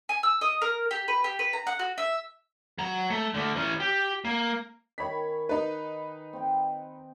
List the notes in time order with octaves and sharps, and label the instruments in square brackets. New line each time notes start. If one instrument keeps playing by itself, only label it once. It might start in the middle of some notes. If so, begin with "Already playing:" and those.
[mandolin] G#5
E6
D#5
A#4
G4
B4
G4
B4
A#5
F#5
F#4
E5
[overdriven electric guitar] F#3 A#5
A3
D3 A3
E3 C#4
G4
A#3
[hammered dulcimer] D#3 G#5 [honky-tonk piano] C#5 B5 B6
[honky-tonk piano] D#4 B4
[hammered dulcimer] C4 G5